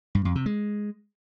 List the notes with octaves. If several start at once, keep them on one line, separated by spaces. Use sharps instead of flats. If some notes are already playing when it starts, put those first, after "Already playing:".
G2
F2
C3
G#3